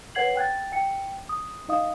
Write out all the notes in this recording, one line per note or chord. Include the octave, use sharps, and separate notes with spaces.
B4 C#5 F#5 G#6 C7 F#7
G5 F#6 G#6 A6
G5 C#7
D#6
D#4 D#5 F5 D#6